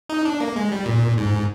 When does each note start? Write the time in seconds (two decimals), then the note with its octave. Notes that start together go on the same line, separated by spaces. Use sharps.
0.09 D#4
0.25 D4
0.40 A#3
0.56 G#3
0.72 G3
0.86 A#2
1.18 G#2